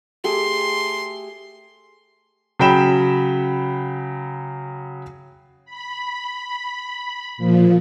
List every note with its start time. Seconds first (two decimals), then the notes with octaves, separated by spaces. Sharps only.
0.24 A3 G4 G#4 C6
2.59 C#3 F#3 G5 B5 E7
5.65 B5
7.37 A#2 F3